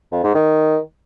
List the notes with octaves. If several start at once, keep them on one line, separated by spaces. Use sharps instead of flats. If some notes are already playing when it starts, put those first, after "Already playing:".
F2
G#2
D#3